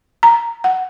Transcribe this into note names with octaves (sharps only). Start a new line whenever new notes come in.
A#5
F#5